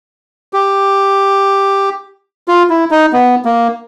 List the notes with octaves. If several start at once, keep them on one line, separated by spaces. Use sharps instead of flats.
G4
F4
E4
D#4
B3
A#3